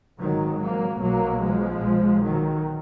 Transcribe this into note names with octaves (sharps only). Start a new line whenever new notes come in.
G#1 G#2 D#3 F#3
F#3 A#3
B1 B2 F#3 A#3
F3 G#3
B1 A#2
D#3 F#3